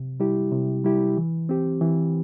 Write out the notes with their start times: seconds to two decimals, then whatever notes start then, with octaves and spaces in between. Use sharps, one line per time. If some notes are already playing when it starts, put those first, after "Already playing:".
Already playing: C3
0.20 G3 E4 G4
0.52 C3
0.84 G3 E4 G4
1.17 E3
1.49 C4 G4
1.81 E3